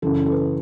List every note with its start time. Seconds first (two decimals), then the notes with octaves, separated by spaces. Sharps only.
0.02 F#2 C#3 E3 A4
0.26 A4
0.32 B4